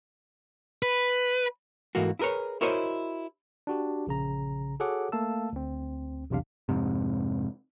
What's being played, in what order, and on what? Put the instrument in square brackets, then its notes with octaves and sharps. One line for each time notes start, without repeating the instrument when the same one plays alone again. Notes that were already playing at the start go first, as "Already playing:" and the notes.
[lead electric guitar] B4
[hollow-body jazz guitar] G#2 E3 A3 A#3 F#4
E4 G#4 A#4 B4 C#5
E4 F#4 A#4 C5 C#5 D#5
[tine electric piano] D4 F#4 G4
A#1 C#3 A#5
F#4 G#4 A4 C#5 F#5 D6
A3 A#3 F5 A5 E6
D2 C4
B1 E2 C3 D4 F5
[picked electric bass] F2 G#2 C3